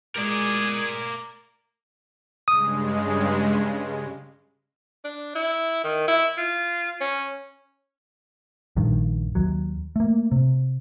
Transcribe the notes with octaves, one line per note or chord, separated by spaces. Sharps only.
G#3 G#4 A#4 D5
G2 C#3 G#3 D#6
D4
E4
D#3
E4
F4
C#4
A#1 G2 D#3
D#2 F#3
A3 A#3
C3